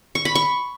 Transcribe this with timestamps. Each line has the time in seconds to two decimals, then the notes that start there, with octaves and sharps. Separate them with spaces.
0.15 C#6
0.25 B5
0.35 C#6